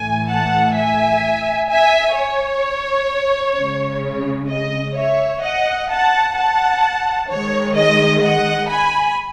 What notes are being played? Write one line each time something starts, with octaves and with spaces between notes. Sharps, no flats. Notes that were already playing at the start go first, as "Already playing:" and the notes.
Already playing: A2 E3 A3 G#5
F#5 A5
E5 G#5
E5 G#5
C#5
C#3 G#3
D#5
C#5 E5
D#5 F#5
F#5 A5
F#5 A5
D#3 G#3 C#5
D#5
D#5 F#5
G#5 B5